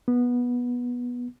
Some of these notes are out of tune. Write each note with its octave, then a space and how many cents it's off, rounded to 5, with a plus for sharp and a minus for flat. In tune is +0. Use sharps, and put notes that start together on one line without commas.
B3 -15